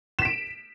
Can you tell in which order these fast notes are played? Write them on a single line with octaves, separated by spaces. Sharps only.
E7 B6 D7